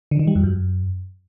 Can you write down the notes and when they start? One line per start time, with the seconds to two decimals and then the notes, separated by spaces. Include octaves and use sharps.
0.11 D3
0.19 D#3
0.27 G3
0.35 F2
0.43 F#2